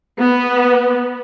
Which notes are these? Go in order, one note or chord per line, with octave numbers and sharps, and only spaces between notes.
B3